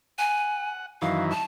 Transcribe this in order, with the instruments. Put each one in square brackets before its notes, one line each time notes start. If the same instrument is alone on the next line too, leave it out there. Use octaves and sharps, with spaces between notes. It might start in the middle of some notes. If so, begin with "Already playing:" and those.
[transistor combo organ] F#5 [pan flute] G#5
[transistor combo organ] F#2 D#3 E3 [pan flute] F5
[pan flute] A5